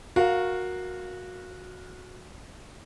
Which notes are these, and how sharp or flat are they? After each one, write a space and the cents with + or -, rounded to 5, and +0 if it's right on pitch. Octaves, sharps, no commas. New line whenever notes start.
F#4 -15 A#4 +0 F5 +0